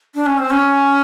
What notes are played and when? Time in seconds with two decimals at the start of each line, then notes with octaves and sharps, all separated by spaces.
0.15 D4
0.26 C#4
0.38 C4
0.50 C#4